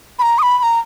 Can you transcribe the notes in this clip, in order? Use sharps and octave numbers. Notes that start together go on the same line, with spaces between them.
B5
A#5
D#6
B5
B5
A#5